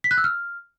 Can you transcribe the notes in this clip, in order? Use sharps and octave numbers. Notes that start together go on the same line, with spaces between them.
B6
F#6
E6
F6